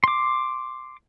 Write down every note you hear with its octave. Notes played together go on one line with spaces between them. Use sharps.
C6 D6